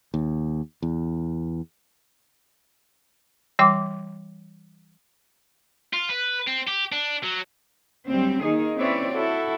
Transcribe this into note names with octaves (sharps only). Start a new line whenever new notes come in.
D#2
E2
E3 G3 G5 C6 D6
F4
B4
C4
G4
D4
F#3
D2 F#3 G3 C4
D#3 A#3 D#4 G#4
C4 C#4 E4 B4 C#5 D5
E4 F#4 A4